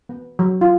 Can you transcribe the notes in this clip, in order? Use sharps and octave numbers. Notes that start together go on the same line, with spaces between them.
B3
F#3
F4